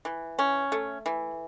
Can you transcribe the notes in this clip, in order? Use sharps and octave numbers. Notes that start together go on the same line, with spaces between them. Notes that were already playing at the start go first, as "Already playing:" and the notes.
E3
C#4
A3
E3